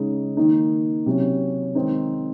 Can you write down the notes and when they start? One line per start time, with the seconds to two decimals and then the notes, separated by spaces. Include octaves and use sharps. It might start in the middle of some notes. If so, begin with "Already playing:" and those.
Already playing: C#3 G#3 D#4
0.37 D#3 A#3 D#4
1.06 C3 F#3 C#4
1.75 D#3 G#3 C4 D#4